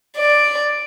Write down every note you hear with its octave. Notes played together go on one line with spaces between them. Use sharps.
D5